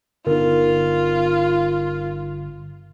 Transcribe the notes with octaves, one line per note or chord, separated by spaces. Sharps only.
G1 D3 B3 D#4 F4 A#4